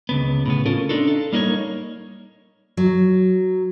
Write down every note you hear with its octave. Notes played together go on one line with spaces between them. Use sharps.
C#2 C#3 B3
A2 C#3 B3
C#4 F4 A4 A#4
D4 D#4 F4 A4
A4
G3 A#3 D#4 A#4 C#5
F#3